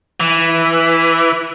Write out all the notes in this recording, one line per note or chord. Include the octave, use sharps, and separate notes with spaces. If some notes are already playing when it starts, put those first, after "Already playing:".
E3